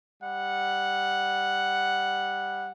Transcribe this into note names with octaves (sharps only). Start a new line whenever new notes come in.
G3 F#5